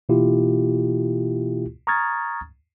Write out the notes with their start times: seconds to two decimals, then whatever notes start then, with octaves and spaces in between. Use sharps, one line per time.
0.09 B2 E3 A#3 E4 F4 G4
1.87 A#5 C#6 D#6 F6 G#6 A6